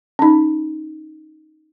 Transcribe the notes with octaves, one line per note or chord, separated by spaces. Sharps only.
C#4 D#4